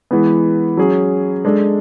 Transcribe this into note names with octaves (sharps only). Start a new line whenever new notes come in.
E3 G#3 B3
F#3 C#4 G#4
G#3 D4 A4